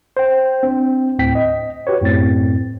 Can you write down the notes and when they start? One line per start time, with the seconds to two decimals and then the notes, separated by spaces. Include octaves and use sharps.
0.17 C5 G5
0.63 C4 D4
1.19 D2 A2 C4 G5 B6
1.35 D#5
1.87 F#4 G4 B4 C#5
2.01 F#2 A2 C4 A6